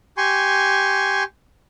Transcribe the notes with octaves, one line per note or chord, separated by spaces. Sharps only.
G4 G#5 C6 C#6